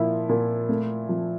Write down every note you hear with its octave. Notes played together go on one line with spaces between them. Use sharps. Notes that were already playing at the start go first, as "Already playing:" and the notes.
Already playing: A#2 F3 E4
A#2
A3
F3